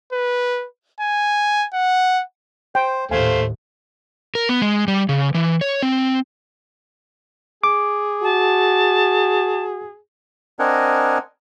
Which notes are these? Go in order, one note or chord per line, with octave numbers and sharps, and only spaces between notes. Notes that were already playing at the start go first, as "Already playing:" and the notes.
B4
G#5
F#5
C5 G5
D#2 A2 A3 C5 F5 G#5
A#4
B3
G#3
G3
C#3
E3
C#5
C4
G#4 D6
F#4 A5
C4 D4 A#4 D#5 F#5 G#5